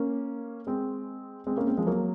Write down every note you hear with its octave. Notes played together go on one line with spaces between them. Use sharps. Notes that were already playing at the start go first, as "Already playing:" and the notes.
Already playing: A#3 C#4
G#3 C4
G#3 C4
A#3 C#4
G#3 C4
F3 G#3
F#3 A#3